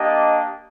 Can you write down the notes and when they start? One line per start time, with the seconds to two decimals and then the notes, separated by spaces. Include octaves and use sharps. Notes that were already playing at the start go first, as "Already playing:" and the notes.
Already playing: A#3 D4 G4 D#5